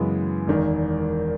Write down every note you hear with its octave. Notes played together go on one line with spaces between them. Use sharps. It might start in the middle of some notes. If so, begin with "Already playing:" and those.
Already playing: F#2 C#3 E3 G#3 B3
E1 E2 D#3